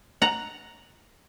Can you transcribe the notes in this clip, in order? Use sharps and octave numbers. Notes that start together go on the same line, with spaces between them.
F#5 A#5